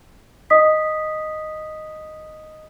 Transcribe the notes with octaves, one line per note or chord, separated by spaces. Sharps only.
D#5 D#6 B6